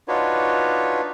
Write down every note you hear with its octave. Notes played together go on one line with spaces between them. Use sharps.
D4 D#4 F4 F#4 B4 C#5